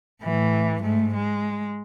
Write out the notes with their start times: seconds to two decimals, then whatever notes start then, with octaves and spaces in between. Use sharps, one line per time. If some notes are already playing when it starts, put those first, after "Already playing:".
0.23 A2 E3
0.81 G#2 A3
1.14 G#3